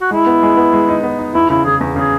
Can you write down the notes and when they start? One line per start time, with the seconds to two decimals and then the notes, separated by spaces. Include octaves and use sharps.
0.01 F#4
0.11 G#3 E4
0.26 B3
0.43 G#3
0.57 B3
0.73 G#3
0.89 D#4
1.03 B3
1.19 D#4
1.34 E2 E4
1.50 C#3 E4
1.65 C#3 G#4
1.81 E2
1.96 C#3 G#4